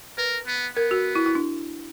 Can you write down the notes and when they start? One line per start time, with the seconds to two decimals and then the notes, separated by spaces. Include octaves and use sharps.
0.18 A#4 B4
0.47 B3
0.76 B3 A#4
0.91 F#4
1.15 E4
1.26 E4
1.35 D4